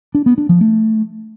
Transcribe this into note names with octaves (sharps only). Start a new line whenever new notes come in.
D4
B3
D4
F3
A3